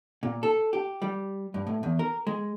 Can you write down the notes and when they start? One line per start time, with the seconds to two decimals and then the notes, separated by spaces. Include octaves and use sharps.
0.23 A#2
0.43 A4
0.73 G4
1.02 G3
1.54 G2
1.67 A2
1.83 E2
1.99 A#4
2.27 G#3